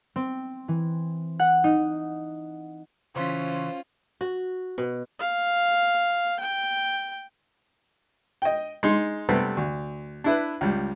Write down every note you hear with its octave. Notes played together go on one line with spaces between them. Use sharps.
C4
E3
F#5
D#4
C#3 E3 C#4 F4 C5
F#4
B2
F5
G5
D#5 G5
G#3 D#4 C6
C3 G3 A3 B3 C4
D2
D4 E4 B4
C#2 G3